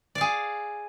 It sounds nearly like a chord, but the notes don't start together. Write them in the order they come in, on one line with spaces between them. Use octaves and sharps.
D5 F5 G#4